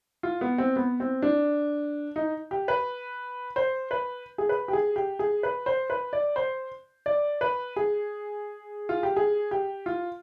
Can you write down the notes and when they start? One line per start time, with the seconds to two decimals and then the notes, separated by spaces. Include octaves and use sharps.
0.23 F4
0.41 B3
0.58 C4
0.76 B3
1.00 C4
1.22 D4
2.16 D#4
2.51 G4
2.68 B4
3.56 C5
3.91 B4
4.38 G#4
4.49 B4
4.68 G4
4.73 G#4
4.96 G4
5.19 G#4
5.43 B4
5.66 C5
5.90 B4
6.13 D5
6.36 C5
7.06 D5
7.41 B4
7.76 G#4
8.89 F4
9.03 G4
9.16 G#4
9.51 G4
9.86 F4